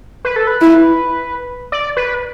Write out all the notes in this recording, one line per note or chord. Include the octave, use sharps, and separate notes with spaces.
B4
A4
B4
E4
D5
B4